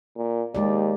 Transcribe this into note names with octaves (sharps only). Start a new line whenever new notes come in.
A#2
D#2 G#3 G4 D5